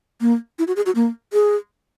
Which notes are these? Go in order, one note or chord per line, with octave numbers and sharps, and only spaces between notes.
A#3
E4
F#4
G#4
F#4
A#3
G#4